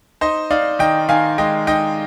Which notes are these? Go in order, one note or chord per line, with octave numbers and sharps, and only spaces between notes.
D#4 C5 D#5
D#4 D5 F5
D#3 D#5 G5
D#3 F5 G#5
G#3 D#5 G5
D#4 D#5 G5